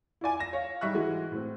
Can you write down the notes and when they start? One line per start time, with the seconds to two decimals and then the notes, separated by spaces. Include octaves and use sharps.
0.21 E4 F4 D5 G#5
0.40 A#6 E7
0.53 C#5 F5
0.81 G#2 G3 E5 C#6 F#6
0.94 E3 G#3 F#4
1.31 A2 C4